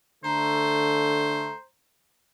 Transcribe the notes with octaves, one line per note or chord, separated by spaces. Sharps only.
D3 A3 C5 A#5